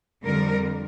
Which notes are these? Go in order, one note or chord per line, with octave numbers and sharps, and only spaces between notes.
F2 D3 G3 A#4